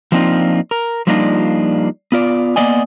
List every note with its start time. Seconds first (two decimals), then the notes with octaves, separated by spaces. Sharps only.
0.12 F3 A#3 C4 D4 D#4 F4
0.71 A#4
1.07 F3 G3 A#3 D4 D#4 F4
2.12 B3 F4 D5
2.56 A#3 B3 D5 D#5 G#5